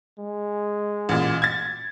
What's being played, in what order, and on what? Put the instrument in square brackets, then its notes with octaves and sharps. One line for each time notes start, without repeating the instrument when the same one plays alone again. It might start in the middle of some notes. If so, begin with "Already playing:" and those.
[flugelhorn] G#3
[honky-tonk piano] A1 A#2
G#6 A6